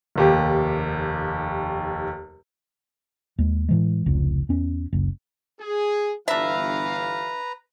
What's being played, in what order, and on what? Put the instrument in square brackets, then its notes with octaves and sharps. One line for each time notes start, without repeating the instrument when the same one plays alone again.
[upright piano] F1 D#2 G4
[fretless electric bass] D#2 G#3
A2 E3 G#3
F1 C#2
E2 C#4
F#1 C#2
[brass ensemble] G#4
[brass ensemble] G1 E3 F5 [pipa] D4 E5 [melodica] B4 A#5